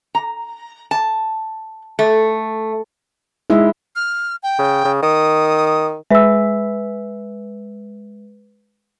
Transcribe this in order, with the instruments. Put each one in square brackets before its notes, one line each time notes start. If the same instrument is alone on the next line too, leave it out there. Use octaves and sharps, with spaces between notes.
[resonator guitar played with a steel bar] A#5
A5
A3
[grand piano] G#3 [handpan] D#4 E4 E5
[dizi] F6
G5
[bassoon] C#3
C#3
[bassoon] D#3 [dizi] D#6
[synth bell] G#3 B4 [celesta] E5 E6